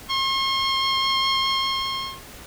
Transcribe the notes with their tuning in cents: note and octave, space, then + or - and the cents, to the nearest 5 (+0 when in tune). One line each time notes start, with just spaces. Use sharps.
C6 +45